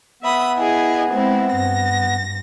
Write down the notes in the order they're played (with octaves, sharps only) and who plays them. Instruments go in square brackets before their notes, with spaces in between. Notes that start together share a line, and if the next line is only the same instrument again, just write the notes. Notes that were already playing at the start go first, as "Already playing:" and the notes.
[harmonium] B3 [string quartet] E5 B5 D#6
[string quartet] E4 G#4 D#5
G#3 C4 E4
G2 A#6